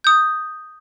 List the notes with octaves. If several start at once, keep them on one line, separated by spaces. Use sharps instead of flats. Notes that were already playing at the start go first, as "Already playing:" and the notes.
D#6 G6